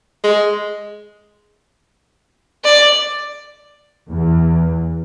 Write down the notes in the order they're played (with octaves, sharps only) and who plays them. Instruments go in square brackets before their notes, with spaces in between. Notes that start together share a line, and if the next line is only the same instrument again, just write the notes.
[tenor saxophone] G#3
[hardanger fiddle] D5
[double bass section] E2